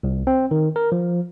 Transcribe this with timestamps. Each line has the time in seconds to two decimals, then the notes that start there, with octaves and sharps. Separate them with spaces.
0.03 C2
0.27 C4
0.51 D#3
0.76 A#4
0.92 F3